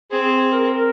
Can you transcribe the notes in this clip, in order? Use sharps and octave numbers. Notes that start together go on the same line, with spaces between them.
C4 G#4
G#4
A#4
A#4